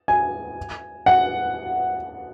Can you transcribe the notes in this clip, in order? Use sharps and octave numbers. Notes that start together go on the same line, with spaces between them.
G#5
F#5